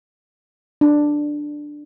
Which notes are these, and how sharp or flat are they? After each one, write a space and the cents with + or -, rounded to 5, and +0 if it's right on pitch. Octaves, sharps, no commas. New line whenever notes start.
D4 +5